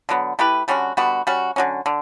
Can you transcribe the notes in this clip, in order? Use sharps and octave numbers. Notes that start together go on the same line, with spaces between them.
D3 F#3 B3
A3 E4 G4 B4
D3 G3 C#4 F#4
D3 G3 B3 F#4
G3 C#4 F#4
D3 F#3 C#4
D3